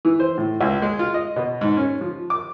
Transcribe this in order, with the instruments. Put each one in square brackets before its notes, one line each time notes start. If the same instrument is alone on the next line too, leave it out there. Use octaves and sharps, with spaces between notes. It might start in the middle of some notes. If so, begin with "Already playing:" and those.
[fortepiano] E3
C5
A2
C#2
G#3
F4
D#5
B2
G#2
C#4
F3
D6